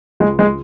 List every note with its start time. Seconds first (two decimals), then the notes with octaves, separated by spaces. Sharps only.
0.20 C#2 G#3
0.39 G#3